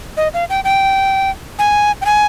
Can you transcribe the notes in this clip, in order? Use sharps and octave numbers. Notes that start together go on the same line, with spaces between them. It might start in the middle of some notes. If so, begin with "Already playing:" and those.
D#5
F5
G5
G5
G#5
G5
G#5